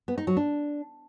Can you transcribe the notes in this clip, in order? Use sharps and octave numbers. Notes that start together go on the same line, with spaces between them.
B3
D#4
F#3
D4